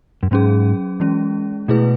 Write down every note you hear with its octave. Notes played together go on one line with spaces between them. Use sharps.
F#2
G#2 F#3 C#4 G#4
E3 G#3 C#4
B2 A3 E4 G#4 B4